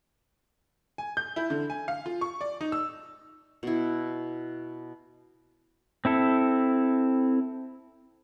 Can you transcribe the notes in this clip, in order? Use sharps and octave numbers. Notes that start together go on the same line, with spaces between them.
G#5
G6
E4
D3
G#5
F5
F4
C#6
D5
D#4
E6
B2 E4
C4 E4 A4